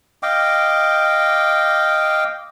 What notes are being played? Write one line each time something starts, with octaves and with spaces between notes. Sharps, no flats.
D#5 F5 G5 D6